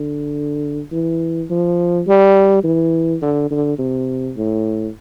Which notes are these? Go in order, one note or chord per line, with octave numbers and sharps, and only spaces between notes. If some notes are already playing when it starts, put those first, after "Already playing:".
Already playing: D3
E3
F3
G3
E3
D3
D3
C3
A2